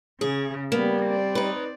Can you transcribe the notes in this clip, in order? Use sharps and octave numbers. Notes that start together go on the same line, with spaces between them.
C#3 G#4
G3 A#3 B3
C4 D5
D#4 B4